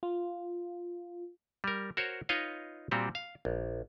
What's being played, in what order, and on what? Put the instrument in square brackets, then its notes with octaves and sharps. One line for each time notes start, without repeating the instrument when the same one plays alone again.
[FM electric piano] F4
[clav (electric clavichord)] G3 A#4
F#4 A#4 C5 C#5
D#4 F4 B4 C#5 D#5 F5
A#2 G3 C4 F#4 G4
F5
A#1